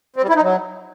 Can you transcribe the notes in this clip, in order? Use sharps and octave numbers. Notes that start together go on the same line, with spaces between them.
C4
G3
E4
D#4
F#3